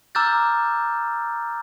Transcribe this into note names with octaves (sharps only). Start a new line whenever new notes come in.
A#5 D6 E6 F6 G6 A6